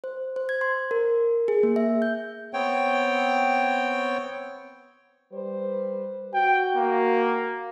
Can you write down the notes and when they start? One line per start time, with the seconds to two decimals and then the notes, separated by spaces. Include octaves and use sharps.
0.04 C5
0.36 C5
0.49 G#6
0.61 C6
0.91 A#4
1.48 G#4
1.63 A#3
1.76 E5
2.02 G6
2.54 B3 C4 C#5 G5
5.32 G3 B4 C5
6.34 F#4 G5
6.76 A#3